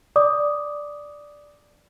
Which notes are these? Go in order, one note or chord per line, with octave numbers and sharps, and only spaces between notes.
D5 D6 D#6